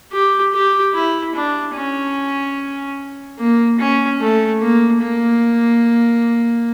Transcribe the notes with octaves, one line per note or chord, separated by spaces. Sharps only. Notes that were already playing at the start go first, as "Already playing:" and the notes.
G4
G4
E4
D4
C#4
A#3
C#4
A3
A#3
A#3